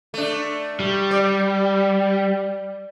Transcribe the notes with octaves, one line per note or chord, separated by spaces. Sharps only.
A3 D4
G3
D5